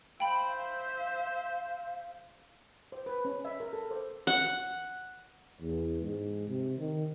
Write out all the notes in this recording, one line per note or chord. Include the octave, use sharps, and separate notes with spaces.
C5 E5 F5 G5 B5
C5
B4
C#4
E5
A#4
A4
C5
F#5
E2
G#2
C3
D#3